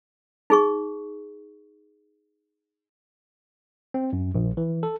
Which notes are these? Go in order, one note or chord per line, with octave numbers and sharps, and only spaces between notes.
D#4 G#4 C#6
C4
F#2
A#1
E3
A4